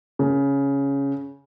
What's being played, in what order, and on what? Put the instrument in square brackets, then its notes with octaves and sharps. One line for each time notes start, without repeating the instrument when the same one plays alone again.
[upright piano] C#3